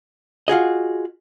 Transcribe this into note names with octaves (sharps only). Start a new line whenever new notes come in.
F4 F#4 G#4 D#5